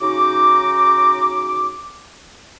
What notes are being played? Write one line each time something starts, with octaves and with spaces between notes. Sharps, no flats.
C#3 D#4 F#4 D6